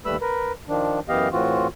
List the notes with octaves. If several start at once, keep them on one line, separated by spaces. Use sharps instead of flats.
D#2 G3 A3 B4 B5 E6
A#4 B4
D#3 F3 D4
F#2 E3 B3 G4 D#5 F5
A2 E3 C4 F4 F#4